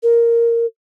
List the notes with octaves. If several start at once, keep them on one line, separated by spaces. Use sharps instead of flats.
A#4